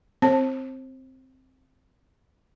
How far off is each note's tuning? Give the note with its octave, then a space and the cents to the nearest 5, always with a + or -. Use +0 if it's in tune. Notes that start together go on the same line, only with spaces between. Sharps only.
C4 +0 C5 +35 A5 +0